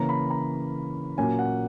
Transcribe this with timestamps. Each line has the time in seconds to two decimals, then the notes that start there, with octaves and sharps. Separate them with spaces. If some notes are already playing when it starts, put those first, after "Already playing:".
Already playing: C#3 E3 A#3 C#4 A#5
0.09 B5
0.30 A#5
1.17 A#2 F#3 A#3 C#4 G#5
1.39 F#5